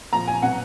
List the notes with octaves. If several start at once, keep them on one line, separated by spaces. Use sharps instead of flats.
A#2 F3 A#5
G#5
B2 F#3 F#5